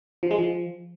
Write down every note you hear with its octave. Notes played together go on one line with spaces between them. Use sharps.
F3
G#3
F3